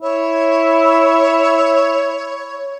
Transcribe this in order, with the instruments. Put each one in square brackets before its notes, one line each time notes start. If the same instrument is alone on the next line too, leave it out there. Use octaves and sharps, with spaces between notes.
[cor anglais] E4 [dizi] C#5